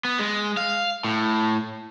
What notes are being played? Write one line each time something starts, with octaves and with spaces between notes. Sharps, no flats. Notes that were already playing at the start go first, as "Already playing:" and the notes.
B3
G#3
F5
A2